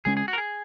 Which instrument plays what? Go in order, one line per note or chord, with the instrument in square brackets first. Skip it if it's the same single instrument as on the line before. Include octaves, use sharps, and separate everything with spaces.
[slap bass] C#3 G#3 C#4 [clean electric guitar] G#4
[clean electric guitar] G#4
F#4
A#4
G#4